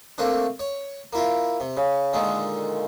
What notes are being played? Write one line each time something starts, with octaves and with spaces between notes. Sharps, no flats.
A3 A#3 C4 D4
C#5
A#3 E4 F4
C3
C#3
A#2 D3 D#3 G#3